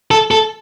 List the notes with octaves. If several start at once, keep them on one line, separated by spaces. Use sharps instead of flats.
A4
A4